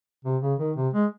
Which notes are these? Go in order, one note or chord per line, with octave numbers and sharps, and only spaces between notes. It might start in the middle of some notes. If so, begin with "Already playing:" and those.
C3
C#3
D#3
C3
G#3